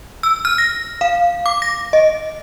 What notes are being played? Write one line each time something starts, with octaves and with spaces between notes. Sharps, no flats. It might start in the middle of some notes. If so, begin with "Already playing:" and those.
E6
F6
A#6
F5
D6
A#6
D#5